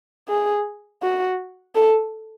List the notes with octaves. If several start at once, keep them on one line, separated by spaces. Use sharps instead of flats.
G#4
F#4
A4